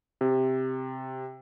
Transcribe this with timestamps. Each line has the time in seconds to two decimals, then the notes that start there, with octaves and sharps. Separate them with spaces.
0.21 C3